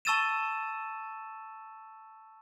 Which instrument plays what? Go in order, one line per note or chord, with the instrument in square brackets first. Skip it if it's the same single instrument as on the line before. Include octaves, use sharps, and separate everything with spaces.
[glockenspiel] A5 C#6 E6 A6 D#7 E7